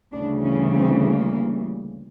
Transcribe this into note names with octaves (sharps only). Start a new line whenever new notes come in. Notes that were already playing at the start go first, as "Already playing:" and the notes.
D2 C#3 E3 G3 D4
C#4
C4
A#3